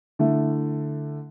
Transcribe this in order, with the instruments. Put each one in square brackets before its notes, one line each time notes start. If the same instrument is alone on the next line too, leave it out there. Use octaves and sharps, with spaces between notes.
[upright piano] D3 A3 E4